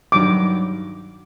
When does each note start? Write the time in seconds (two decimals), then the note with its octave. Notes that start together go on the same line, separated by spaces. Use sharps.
0.12 G2 D#3 F#3 D6